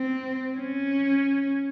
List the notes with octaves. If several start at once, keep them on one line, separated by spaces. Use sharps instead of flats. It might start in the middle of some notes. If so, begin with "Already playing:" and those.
Already playing: C4
C#4